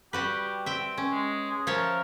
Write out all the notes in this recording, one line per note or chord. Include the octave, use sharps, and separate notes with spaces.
G3 F#4 G4 B4
C4 E5 G5
C#4
G#3
G#4
F3 A#4 C#5 E5